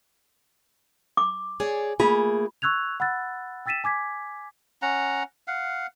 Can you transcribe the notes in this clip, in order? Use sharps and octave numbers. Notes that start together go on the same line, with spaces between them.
D6
G#4 C#5 D5
A3 A#3 F4 G#4 B5
C#6 E6 F#6 G#6 F7
F#5 B5 E6 F#6 A6
G5 E6 A6 B6 D#7 E7
G#5 D6 G#6 B6
C#4 F#5 A#5
F5 F#5